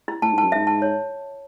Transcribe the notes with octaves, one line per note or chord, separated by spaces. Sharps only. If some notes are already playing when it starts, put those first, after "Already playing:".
E4
A2 A5
G#2 A5
F#2
G#2 E5
A5
C#5